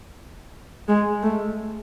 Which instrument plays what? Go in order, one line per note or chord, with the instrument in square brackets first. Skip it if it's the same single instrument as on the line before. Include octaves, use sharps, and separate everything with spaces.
[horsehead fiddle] G#3
A3